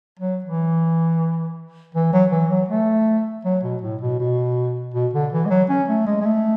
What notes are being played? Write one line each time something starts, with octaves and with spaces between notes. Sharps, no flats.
F#3
E3
E3
F#3
E3
F#3
A3
F#3
B2
A2
B2
B2
B2
D3
E3
G#3
F#3
C#4
A3
G#3
G#3
A3